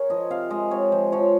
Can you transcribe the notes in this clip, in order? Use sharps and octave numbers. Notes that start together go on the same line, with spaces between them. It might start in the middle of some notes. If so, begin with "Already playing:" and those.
Already playing: G#4 A#4 C#5
F3 D#5
C3 F5
G#3 D#5
C3 C#5
F3 C5
F3 C#5